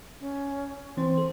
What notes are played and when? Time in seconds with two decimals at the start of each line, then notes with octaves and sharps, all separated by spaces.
0.20 C#4
0.97 E3 C4 C5 C6
1.18 A4